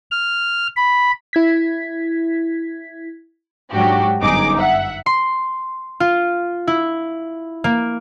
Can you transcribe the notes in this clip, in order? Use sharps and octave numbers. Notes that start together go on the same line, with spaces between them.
F6
B5
E4 G#6 B6
G#2 F#3 D4 F#4 G4
G1 F#2 D#4 G#4 D6
E5 F#5
C6
F4
E4
A#3